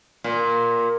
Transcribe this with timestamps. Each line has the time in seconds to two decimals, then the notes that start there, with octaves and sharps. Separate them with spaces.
0.24 A#2